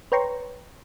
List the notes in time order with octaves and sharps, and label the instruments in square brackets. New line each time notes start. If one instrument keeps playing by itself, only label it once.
[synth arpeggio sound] B4 C#5 G5 A#5 C6 C#6